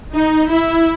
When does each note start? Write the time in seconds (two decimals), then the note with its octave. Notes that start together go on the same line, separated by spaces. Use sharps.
0.13 D#4
0.50 E4